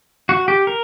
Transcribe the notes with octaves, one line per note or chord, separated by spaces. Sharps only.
F#4
G4
A#4